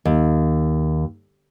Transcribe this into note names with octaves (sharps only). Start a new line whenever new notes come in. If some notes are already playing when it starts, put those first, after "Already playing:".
D#2